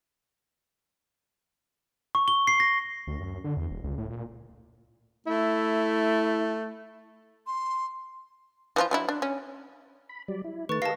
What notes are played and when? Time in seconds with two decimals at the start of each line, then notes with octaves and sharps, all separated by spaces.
2.15 C#6
2.28 G7
2.47 C7
2.60 A#6
3.07 D2
3.20 F#2
3.44 D3
3.57 E2
3.71 D#1
3.84 C#2
3.98 A2
4.10 A#2
5.27 A3 E4
7.47 C6
8.76 E3 F3 F4
8.91 F#3 D4 E4
9.09 D4
9.22 C#4
10.09 B5
10.28 F#3 G3 D5
10.44 E4
10.69 D#3 A3 B4 C#6 A6
10.82 G4 A#4 D#5 F5 A5 A#6 C7